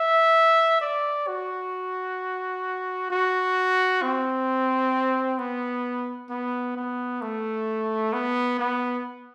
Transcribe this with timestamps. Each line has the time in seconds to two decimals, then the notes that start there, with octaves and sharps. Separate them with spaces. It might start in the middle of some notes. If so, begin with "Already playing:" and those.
Already playing: E5
0.81 D5
1.28 F#4
3.11 F#4
4.02 C4
5.38 B3
6.30 B3
6.77 B3
7.22 A3
8.13 B3
8.59 B3